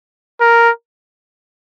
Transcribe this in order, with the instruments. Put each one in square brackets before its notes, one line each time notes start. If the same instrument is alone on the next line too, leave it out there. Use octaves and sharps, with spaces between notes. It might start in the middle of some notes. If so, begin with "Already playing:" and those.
[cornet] A#4